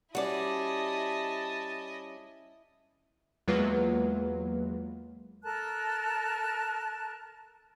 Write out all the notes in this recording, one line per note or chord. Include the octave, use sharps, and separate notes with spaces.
G3 C#4 E4 F#4 D5 D#5 A5
E2 F#3 G#3 A#3 F4 B4
A4 A#4 A5 F#6